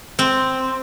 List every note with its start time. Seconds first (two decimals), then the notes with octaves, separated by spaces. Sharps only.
0.19 C4